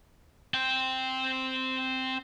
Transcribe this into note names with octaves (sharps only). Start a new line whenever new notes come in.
C4 G5